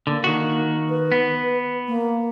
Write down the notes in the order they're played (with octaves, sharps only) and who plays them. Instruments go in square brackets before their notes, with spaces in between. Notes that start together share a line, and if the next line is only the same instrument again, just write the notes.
[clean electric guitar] D3 [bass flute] A#3
[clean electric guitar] D#3 F#4
[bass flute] B4
[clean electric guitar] B3
[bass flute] A#3